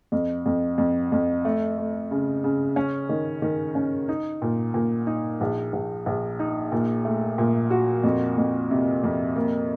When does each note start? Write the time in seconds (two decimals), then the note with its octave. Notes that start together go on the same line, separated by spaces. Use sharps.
0.12 F2
0.46 F2
0.78 F2
1.12 F2
1.45 A3
1.78 A3
2.11 C#3
2.44 C#3
2.76 C#4
3.09 D#3
3.42 D#3
3.75 C#4
4.09 D#4
4.42 A#2
4.74 A#2
5.07 D#4
5.41 A#1
5.73 A#1
6.06 A#1
6.39 D#4
6.72 A#2
7.05 A3
7.38 A#2
7.71 F#4
8.04 F2
8.38 F2
8.71 C3
9.04 F2
9.36 A#3